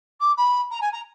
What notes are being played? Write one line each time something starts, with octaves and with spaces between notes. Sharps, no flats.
D6
B5
A#5
G#5
A#5